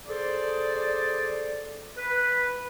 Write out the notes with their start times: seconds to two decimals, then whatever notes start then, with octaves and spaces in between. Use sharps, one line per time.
0.07 G#4 A4 C5 D5
1.98 B4